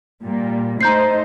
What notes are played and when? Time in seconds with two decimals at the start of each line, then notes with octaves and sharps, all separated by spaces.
0.23 A#2 G3 A#3
0.81 A3 D#4 C5 A#5 G6 C7